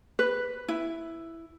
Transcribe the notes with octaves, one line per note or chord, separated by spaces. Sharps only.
B4
E4